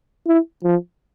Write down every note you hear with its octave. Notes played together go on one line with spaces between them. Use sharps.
E4
F3